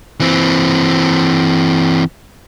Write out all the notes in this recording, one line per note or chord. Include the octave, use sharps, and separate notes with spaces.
E3 C4